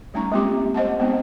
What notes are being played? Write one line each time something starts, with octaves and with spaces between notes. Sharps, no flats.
G3 A3 C#4 D#4 A#5 C#6
G#3 A#3 C4 F4 G4 D6
C5 D#5 F#5 A5
G#3 B3 C4 D#4